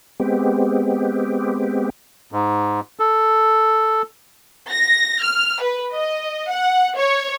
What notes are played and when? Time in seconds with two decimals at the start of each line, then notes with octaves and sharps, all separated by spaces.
0.20 G#3 B3 C4 G4
2.32 G#2
2.99 A4
4.71 A#6
5.23 F6
5.62 B4
5.93 D#5
6.50 F#5
6.97 C#5